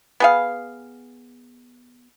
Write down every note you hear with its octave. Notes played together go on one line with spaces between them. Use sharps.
B3 G#4 F5